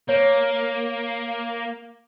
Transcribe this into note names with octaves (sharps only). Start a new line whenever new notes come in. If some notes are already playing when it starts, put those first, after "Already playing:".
A#3 C#5